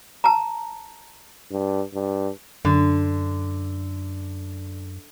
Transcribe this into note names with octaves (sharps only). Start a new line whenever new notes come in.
A5 A#5
G2
G2
F#2 D3